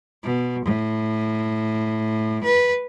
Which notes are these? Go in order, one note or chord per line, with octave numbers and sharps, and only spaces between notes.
B2
A2
B4